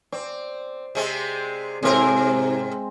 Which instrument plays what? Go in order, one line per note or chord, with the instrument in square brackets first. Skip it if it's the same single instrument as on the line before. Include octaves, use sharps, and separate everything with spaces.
[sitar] C4 [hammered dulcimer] D5
[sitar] C3 G#3 C4
[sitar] G#2 A#4 [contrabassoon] C3 [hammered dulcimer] G#3 C4